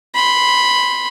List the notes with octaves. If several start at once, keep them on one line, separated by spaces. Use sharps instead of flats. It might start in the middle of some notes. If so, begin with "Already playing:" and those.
B5 C6